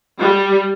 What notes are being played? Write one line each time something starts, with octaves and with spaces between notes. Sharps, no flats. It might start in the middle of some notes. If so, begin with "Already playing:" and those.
G3